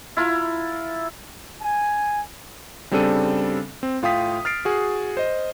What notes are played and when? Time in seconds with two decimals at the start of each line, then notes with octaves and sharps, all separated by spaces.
0.17 E4 F4 A#5
1.62 G#5
2.91 C#3 G3 C4 D4 A4 D#7
3.83 C4
4.02 A2 F4 F5 G5 D#6 B6
4.45 F6 A6 C7 D7
4.65 F#4 G#4
5.17 C5 D#5